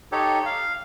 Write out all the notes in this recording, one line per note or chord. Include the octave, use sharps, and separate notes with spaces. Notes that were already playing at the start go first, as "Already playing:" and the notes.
D#4 G4 A4 C#5
F5